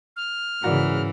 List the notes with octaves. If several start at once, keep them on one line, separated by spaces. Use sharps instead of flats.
F6
G#2 C#3 E3 F#4 A#4 D5